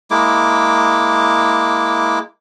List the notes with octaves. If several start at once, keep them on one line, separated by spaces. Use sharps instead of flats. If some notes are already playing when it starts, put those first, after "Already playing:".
G#3 A#3 E4 D6